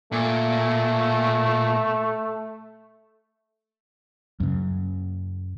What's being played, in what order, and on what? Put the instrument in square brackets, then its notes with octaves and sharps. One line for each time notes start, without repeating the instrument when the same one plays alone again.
[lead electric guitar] A#2 [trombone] A3
[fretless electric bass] F#2 C#3